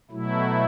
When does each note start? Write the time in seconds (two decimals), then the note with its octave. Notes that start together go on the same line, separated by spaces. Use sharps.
0.11 B2 F#3 A3 E4